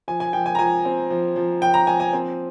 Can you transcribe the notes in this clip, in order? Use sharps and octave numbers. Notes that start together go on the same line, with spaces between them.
F3 G#5
G#5
F3 G5
G#5
A#5
F3 G#5
C4
F3
F3
F3 G5
A#5
F3 G#5
G#5
C4